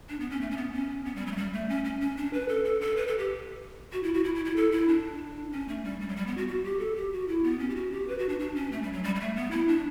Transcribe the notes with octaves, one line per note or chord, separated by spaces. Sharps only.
D4
B3
C#4
A3
C#4
B3
C#4
B3
G3
F#3
A3
G3
A3
C#4
C#4
C#4
D4
B4
A4
A4
A4
B4
A4
G4
F#4
E4
F#4
E4
E4
E4
A4
E4
D4
C#4
A3
G3
G3
F#3
G3
B3
F#4
F#4
G4
A4
G4
F#4
E4
B3
C#4
G4
F#4
G4
B4
F#4
D4
D4
C#4
A3
G3
F#3
G3
G3
A3
B3
E4
D4